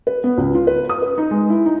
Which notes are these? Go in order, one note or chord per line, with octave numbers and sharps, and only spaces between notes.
B4
B3
C#2
F4
B4
D#6
B4
D#4
G#3
E4
D#4